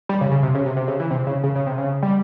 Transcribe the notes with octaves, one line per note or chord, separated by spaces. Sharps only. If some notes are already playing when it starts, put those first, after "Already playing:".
G3
C#3
C#3
C3
C#3
C3
C3
C#3
E3
C3
C#3
C#3
C#3
C3
C#3
G3